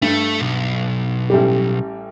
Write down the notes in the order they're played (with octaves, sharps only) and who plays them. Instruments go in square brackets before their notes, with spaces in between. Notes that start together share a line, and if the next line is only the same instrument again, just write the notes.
[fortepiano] G2 [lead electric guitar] A3
[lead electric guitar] B1
[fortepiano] A1 G3 G4